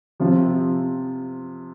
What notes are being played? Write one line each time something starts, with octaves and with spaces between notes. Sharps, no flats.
C3 F3 C4 F4